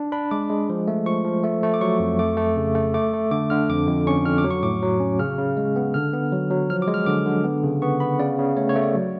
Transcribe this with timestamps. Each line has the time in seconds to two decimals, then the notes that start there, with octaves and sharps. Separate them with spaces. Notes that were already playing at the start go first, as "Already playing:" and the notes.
Already playing: D4
0.12 D4 B5
0.31 G#3 D6
0.50 G#3
0.69 F3
0.87 A3
1.06 F3 C#6
1.25 F3
1.44 A3
1.63 A3
1.74 D6
1.81 F#3 C#6
2.00 F2
2.19 A3 D6
2.37 A3
2.57 C#3
2.75 A3
2.94 A3 D6
3.13 A3
3.31 D3 D6
3.50 D3 F6
3.69 F2 D6
3.88 F2
4.07 C#4 C#6
4.26 F2 F6
4.38 D6
4.44 F#3
4.51 C#6
4.63 A2 D6
4.82 F#3
5.00 C#4
5.19 C#3 F6
5.38 C#3
5.57 G#3
5.76 B3
5.94 D3 F6
6.13 B3
6.33 F#3
6.51 F#3
6.70 F3 F6
6.82 D6
6.88 G#3
6.94 F6
7.06 D3 D6
7.26 D3
7.44 B3
7.63 C#3
7.82 B3 C#6
8.00 B3 B5
8.19 C#3 D5
8.39 C#3
8.57 A3 C#5
8.69 C#5
8.75 A3
8.83 D5
8.95 F#3